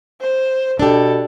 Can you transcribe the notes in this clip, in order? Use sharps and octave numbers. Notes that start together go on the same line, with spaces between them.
C5
B2 D4 G4 A4